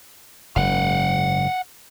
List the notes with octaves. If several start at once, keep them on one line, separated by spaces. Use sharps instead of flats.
F#1 G#2 F5 F#5